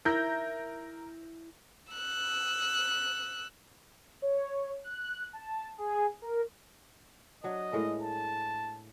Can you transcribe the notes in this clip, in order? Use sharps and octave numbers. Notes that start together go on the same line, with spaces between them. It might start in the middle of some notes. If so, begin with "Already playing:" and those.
E4 A#4 G6 A#6
E6 F#6
C#5
F#6
A5
G#4
A#4
F#3 D4 D#5
A2 G#3 A#4
A5